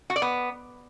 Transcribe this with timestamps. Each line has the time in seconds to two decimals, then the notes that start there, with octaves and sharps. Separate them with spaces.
0.10 F#4
0.16 D5
0.22 B3